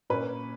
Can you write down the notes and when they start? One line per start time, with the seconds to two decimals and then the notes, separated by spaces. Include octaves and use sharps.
0.10 A#2 A#3 C#4 B4